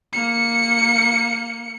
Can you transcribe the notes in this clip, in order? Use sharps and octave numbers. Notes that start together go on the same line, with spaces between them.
A#3 C#7